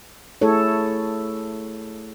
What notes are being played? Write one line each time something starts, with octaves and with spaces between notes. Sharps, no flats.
A3 E4 G#4 A4 C#5